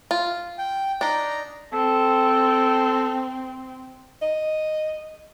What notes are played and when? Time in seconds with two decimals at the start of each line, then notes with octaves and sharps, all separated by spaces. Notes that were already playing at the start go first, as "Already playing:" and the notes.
0.11 F4
0.58 G5
1.01 D4 D#4 A#5
1.73 C4 A4
4.22 D#5